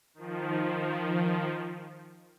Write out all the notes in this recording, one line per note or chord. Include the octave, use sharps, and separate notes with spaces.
D#3 F3